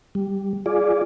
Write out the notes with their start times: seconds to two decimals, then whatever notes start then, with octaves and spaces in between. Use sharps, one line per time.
0.15 G3
0.66 F4 G#4 D5